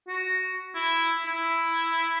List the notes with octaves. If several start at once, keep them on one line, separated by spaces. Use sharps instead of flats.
F#4
E4
E4